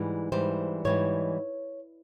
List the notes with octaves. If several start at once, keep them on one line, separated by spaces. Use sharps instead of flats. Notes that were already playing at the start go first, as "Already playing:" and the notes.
Already playing: G#2 E3 G3
G#2 E3 G3 C5
G#2 E3 G3 C#5